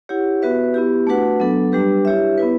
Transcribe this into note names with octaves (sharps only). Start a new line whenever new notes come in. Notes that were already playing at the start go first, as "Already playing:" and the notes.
E4 G4 C#5 F#5
B3 F#4 B4 E5
B3 E4 G4
A3 D4 F#4 B4 F#5
F#3 B3 D4 A4
G3 D4 G4 B4
E4 G4 C#5 E5
B3 E4 B4